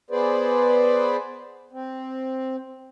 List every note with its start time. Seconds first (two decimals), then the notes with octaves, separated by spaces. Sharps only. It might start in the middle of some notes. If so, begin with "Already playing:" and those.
0.11 B3 G#4 B4 C5 D5
1.72 C4